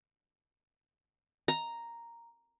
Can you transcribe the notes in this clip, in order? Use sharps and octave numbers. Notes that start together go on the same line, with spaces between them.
A#5